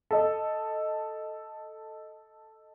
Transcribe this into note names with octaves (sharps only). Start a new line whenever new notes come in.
A4 D#5